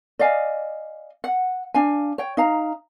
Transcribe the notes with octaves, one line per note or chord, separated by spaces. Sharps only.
D5 D#5 F5 G#5
F#5
D4 F5 G#5
C#5 G5
D#4 F5 A#5